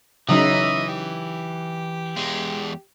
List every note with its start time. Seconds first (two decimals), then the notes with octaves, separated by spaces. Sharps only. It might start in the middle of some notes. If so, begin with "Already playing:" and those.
0.29 C#3 E3 F#3 D#4 D#5 E5 D#6
0.88 G4
2.17 E2 G#3